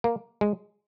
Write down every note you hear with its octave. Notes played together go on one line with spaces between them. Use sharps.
A#3
G#3